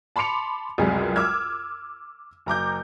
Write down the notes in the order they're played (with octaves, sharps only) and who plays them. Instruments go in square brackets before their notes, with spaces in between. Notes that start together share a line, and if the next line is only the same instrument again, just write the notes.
[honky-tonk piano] A5 B5 C6 D6 C#7 F7
C#2 F#2 C3 G3 G#4 A#4
D6 E6 F6 G#6
F#1 A#5 D6 G6